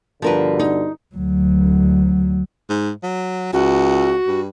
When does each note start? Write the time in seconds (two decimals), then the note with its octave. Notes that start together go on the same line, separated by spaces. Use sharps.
0.22 G2 B2 D3 F3 A#4 B4
0.59 D#4
1.15 D2 F#3
2.69 G#2
3.03 F#3
3.53 C#2 F#4
4.27 G2